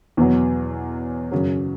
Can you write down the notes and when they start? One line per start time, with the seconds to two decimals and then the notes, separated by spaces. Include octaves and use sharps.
0.17 E2 B2 F#3 B3
1.32 F#2 C#3 F#3